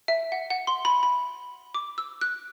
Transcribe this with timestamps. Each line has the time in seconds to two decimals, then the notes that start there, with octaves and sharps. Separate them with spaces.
0.08 E5
0.32 F#5
0.50 F#5
0.67 C6
0.85 B5
1.03 B5
1.74 D6
1.98 E6
2.21 F#6